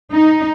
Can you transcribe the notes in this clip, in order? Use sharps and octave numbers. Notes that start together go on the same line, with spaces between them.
D#4